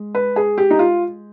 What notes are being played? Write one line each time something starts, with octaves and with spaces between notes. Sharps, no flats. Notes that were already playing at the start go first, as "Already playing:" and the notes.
Already playing: G#3
B4
G#4
G4
D#4
F4